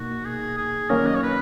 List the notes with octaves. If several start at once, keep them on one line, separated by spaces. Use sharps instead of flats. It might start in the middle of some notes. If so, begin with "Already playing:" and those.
Already playing: B2 A#3 D#4 F#4
G#4
G#4
D#3 F#3 A#3 C#4 A#4
D#5
C#5
B4